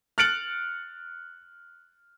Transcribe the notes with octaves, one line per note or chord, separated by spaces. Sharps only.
F6 F#6 A6 C#7 D7 F#7